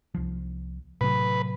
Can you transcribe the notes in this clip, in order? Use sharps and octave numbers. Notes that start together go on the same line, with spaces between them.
C2 F3
A2 C3 F#3 B4